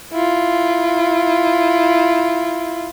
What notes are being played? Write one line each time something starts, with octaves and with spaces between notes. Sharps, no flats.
E4 F4